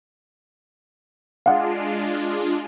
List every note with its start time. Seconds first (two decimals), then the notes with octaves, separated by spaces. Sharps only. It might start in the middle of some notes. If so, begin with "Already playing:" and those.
1.46 G#3 D4 F4 F5 F#5